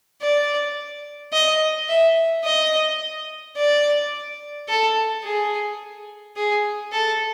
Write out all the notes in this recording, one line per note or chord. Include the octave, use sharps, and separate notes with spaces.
D5
D#5
E5
D#5
D5
A4
G#4
G#4
A4